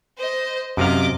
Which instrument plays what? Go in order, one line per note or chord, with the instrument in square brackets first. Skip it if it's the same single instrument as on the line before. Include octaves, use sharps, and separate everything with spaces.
[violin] C5 D#5
[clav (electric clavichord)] F#2 C3 F5 [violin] D#5 D6